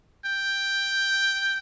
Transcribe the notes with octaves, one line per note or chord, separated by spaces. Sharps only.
G5